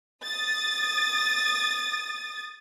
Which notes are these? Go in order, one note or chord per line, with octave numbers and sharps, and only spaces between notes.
D#6 A6